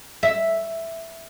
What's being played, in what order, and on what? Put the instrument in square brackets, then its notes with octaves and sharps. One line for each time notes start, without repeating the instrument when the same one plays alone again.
[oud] E5